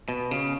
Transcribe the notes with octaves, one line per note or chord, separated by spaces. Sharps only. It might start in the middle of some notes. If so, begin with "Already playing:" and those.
B2
C#3